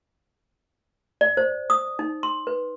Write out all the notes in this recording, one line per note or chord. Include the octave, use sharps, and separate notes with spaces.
D5
C5
D#6
D#4
C6
B4